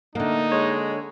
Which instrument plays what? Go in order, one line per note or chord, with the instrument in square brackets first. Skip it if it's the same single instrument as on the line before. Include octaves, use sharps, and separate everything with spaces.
[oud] D3 A#3 [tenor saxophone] A3 [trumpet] D#4
[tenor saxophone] G#3 [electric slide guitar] C#5